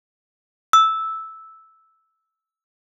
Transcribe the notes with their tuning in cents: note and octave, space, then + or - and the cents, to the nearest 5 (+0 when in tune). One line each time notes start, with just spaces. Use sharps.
E6 -5